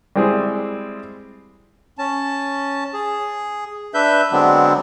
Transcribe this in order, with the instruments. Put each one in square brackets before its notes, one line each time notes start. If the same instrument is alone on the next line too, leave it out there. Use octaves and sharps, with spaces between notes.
[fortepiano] G3 G#3 C4 E4 G#4
[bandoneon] C#4 A5
G#4
D4 B4 E5 G6
D3 F#3 G#3 B3 C4 D4